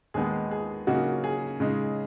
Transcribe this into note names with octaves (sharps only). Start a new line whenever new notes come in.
D#2 D#3 G#3 B3 D#4 G#4
G#4
C#3 F#3 A#3 D#4 F#4
G#4
C#3 G#3 D#4